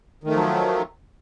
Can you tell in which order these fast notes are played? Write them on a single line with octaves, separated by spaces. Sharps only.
D#3 A3 F3 F#3